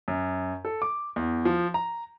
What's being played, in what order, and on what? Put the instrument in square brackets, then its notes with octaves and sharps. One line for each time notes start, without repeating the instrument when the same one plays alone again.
[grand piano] F#2
A4
D6
E2
F3
A#5